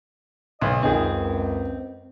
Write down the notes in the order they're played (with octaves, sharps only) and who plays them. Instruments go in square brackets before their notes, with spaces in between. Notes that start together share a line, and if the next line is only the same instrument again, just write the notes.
[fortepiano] B1 [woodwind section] D#5
[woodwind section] C#2 F#2 [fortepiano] D#3 G#4 [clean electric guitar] C4